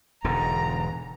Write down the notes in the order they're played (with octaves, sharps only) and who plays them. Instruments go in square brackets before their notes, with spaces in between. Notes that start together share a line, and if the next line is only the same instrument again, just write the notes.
[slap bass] E1 G#2 D3 [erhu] A#5